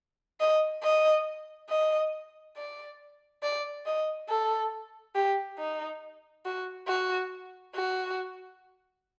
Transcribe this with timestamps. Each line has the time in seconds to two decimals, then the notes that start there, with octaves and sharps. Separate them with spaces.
0.40 D#5
0.83 D#5
1.70 D#5
2.57 D5
3.43 D5
3.86 D#5
4.29 A4
5.15 G4
5.58 D#4
6.45 F#4
6.88 F#4
7.75 F#4